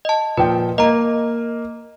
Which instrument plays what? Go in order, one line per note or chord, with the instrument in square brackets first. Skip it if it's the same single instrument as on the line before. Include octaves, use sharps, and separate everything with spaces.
[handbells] D#5 A5
[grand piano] A#2 F3 G5 [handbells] B4
[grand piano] A#3 [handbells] D#5 A#5